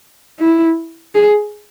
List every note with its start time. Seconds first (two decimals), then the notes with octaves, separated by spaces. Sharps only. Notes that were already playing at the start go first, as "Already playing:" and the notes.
0.40 E4
1.15 G#4